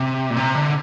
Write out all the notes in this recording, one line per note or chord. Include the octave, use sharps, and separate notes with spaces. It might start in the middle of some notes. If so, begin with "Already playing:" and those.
Already playing: C3
A#2
C3
D3